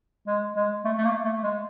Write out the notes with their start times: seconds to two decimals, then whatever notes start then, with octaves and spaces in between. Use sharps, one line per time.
0.27 G#3
0.56 G#3
0.85 A3
0.98 A3
1.04 A#3
1.25 A3
1.43 G#3